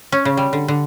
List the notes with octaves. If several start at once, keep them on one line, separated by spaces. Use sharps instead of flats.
C#4
C#3
G3
D3
D3